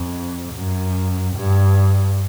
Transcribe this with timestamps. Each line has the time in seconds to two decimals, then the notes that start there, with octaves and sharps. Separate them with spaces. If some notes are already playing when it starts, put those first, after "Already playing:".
Already playing: F2
0.54 F#2
1.35 G2